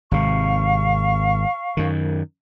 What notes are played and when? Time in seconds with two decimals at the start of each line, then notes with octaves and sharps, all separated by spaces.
0.11 G#1 C3 F5 C#6
1.77 F#2 D#3